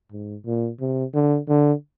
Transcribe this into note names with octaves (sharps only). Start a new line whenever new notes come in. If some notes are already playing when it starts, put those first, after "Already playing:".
G#2
A#2
C3
D3
D3